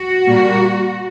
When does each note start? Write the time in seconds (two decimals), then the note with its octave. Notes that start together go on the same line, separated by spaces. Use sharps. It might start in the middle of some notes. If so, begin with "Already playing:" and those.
Already playing: F#4
0.25 A#2 G3 A#3